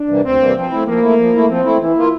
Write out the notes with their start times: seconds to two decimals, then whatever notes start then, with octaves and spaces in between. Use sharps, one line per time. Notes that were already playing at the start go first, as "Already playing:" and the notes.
Already playing: D4
0.09 C3 E3 G3 A#3
0.24 D2 C4
0.40 C3 E3 G3 A#3
0.55 F3 C4
0.71 A3 E4
0.87 F3 A#3
1.02 A3 E4
1.18 F3
1.33 A3 E4
1.49 F3 C4
1.65 A3 E4
1.80 E3 E4
1.96 A#3 F4